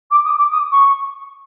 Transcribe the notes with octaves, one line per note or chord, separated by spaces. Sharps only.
D6
D#6
D6
D#6
C#6